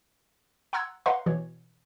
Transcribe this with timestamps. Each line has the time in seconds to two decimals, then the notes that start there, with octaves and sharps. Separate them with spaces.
0.73 F#5 A#5 C6 E6 F#6 G#6
1.06 B4 D#5 F5 F#5 A#5 C6
1.26 B2 E3 C#5